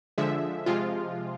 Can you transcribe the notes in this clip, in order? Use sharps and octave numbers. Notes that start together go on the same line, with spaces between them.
D3 F3 G#3 E5
C3 F3 G#3 F4